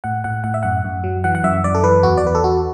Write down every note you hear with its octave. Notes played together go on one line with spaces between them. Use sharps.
A2 F#5
A2 F#5
A2 F#5
E5
F#2 F#5
F#2
F#3
E3 F#5
F#5
F#2 E5
F#2 D5
A4
E3 B4
E2 F#4
D5
E2 B4
A4
E2 F#4